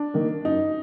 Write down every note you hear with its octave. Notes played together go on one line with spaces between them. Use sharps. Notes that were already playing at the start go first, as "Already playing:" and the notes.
Already playing: D4
D#3 A#3
F#2 D#4